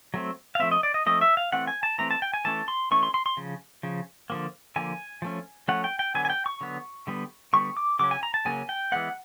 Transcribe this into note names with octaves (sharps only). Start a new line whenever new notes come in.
F#3 A3 C4
F5
F3 A3 C4 E5
D#5
D5
D#5
F3 A3 C4 D#5
E5
F5
E3 A3 C4 F#5
G#5
A5
E3 A3 C4 A#5
A5
G5
G#5
E3 A3 C#4 A5
C6
E3 A3 C#4 C#6
C6
C6
C6
C#3 F3
C#3 F3
D3 F3 A#3
D3 F3 A#3 G#5
F3 A3 C#4
F3 A3 C#4 F#5
G5
G5
D3 F#3 B3 G#5
G#5
G5
C#6
D3 F#3 B3
D3 G3 B3
D3 G3 B3 C#6
D6
C#3 F#3 C#4 D6
G#5
A#5
A5
C#3 F#3 A#3 C#4 G#5
G5
E3 G#3 B3 F#5